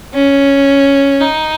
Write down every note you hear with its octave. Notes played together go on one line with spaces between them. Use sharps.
C#4
D#4